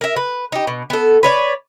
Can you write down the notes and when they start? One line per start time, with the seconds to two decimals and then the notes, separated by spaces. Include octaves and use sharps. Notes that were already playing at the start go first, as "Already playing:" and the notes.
0.01 A#4 E5
0.16 B4
0.52 D#4 G4
0.67 B2
0.90 B3 A4
1.23 B4 C#5 D5